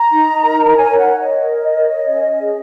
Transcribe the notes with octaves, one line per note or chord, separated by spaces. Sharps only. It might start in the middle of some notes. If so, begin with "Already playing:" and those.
Already playing: A#5
D#4
A#4
C#5 G#5
F#5
C#5
D#5
A#4
C#5
C#4
G#4